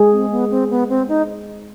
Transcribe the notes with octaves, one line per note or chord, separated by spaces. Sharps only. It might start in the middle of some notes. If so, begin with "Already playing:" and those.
Already playing: G#3 G#4
C4
B3
C4
B3
C4
D#4